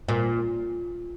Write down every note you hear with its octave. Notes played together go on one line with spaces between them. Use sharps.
A#2